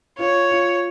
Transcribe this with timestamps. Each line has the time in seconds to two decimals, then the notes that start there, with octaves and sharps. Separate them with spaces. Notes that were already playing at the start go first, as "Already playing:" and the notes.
0.19 F4 C#5
0.51 F4